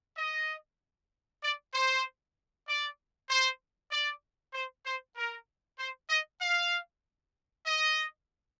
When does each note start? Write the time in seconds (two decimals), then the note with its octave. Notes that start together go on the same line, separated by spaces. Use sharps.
0.17 D#5
1.43 D5
1.74 C5
2.68 D5
3.30 C5
3.92 D5
4.54 C5
4.86 C5
5.16 A#4
5.79 C5
6.10 D#5
6.41 F5
7.66 D#5